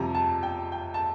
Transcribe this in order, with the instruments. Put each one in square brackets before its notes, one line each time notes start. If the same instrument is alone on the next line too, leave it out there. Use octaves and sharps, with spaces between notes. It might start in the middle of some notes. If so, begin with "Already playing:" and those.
Already playing: [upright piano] F2 C3 G3 A#5
A5
G5
G5
A5